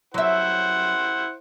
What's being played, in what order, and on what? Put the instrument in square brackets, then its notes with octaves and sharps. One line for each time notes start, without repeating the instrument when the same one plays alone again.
[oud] F#3 E5 [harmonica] E4 C5 [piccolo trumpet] F#5